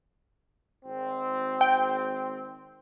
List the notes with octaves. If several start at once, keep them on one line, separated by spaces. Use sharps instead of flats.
G#1 C4
G5